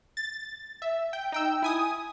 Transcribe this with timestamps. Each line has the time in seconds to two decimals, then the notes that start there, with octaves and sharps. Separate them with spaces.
0.17 A6
0.82 E5
1.13 G5
1.32 D#4 G5 E6
1.62 E4 G#5 D#6